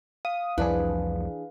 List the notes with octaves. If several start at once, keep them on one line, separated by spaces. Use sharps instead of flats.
F5 D#6
C2 F2 E3 F3 D4 G#4 B4